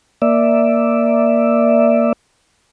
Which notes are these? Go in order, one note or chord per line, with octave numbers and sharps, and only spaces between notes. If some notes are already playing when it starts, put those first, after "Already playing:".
A#3 D5 E5